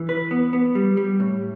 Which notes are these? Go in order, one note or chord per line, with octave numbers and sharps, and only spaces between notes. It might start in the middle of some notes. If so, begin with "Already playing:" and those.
Already playing: E3
B4
B3
B3
G3
G3
A2